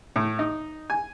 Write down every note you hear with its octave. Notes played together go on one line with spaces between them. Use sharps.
A2
D#4
G#5